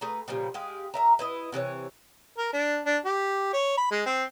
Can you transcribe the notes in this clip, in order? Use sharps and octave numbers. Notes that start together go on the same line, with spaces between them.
A3 G#4 B4 A#5
A#2 C#3 F3 G3
G#3 G4 G#4 F5
A#4 E5 A#5
E4 B4 D#5
C3 E3 A4 C#5
A#4
D4
D4
G4
C#5
B5
G#3
C4